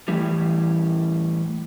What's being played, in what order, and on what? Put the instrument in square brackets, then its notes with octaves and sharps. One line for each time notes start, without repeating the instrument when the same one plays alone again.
[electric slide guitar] A2 E3 G3